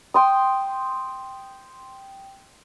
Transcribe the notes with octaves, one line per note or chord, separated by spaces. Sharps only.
G5 C6 D#6